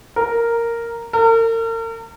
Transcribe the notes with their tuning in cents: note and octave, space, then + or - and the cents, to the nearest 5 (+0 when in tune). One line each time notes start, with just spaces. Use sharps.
A#4 -5
A#4 -40